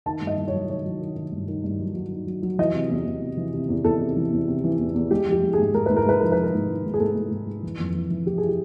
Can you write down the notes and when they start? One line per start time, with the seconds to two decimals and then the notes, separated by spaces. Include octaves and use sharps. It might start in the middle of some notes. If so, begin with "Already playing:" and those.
0.06 D#3 A5
0.22 G2
0.27 D#5
0.38 G2
0.48 C#5
0.54 F#3
0.70 D#3 C#5
0.85 F#3
1.01 D#3
1.16 D#3
1.32 G2
1.48 D#3
1.64 G2
1.79 F#3
1.95 F#3
2.11 D#3
2.27 F#3
2.42 F#3
2.59 E3 D#5
2.74 C3
2.90 E2
3.06 E2
3.22 C3
3.37 E3
3.53 C3
3.69 E2
3.84 E2 A4
4.01 C3
4.16 E3
4.32 E2
4.48 C3
4.64 E3
4.79 E2
4.95 E2
5.11 G#3 G4
5.26 F3
5.32 G4
5.42 G#3
5.53 G#2 G#4
5.73 G#2 A#4
5.86 G#2 B4
5.97 A#4
6.06 G#3 B4
6.21 F3 A#4
6.32 F3 B4
6.44 A#4
6.53 G#2
6.69 G#3
6.85 G#2
6.94 G#4
7.00 G#2 A4
7.15 G#2
7.31 G#2
7.47 G#3
7.63 E3
7.80 F2
7.95 E3
8.10 E3
8.26 E3 G4
8.38 G#4
8.49 G4